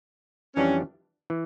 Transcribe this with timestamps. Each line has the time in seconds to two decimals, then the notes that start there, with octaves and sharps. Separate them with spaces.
0.56 F2 E3 G3 C#4 D4 G4
1.30 E3